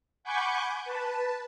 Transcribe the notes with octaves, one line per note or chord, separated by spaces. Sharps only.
F#5 G#5 B5 C#6 D6 G6
B4 A5